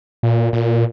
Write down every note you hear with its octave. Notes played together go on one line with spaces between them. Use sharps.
A#2
A#2